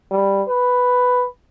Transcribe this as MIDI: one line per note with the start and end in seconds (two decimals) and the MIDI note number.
0.11 0.43 55
0.48 1.25 71